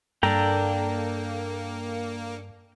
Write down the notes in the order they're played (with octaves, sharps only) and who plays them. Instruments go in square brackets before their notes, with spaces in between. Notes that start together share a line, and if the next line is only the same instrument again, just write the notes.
[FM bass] G2 [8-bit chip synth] A#3 [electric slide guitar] D4 A4 [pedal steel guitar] G5 A#5